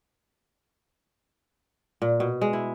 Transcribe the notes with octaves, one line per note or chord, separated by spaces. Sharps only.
A#2
B2
G#3
E4